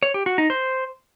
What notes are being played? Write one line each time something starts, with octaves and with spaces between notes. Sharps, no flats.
C#5
G4
F#4
D#4
C5